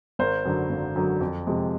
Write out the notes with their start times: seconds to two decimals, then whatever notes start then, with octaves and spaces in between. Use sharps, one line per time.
0.19 G#1 A#4 C5
0.45 F#2 D3 F#3
0.70 G#1
0.96 F#2 D3 F#3
1.21 F2
1.47 C3 F3 G#3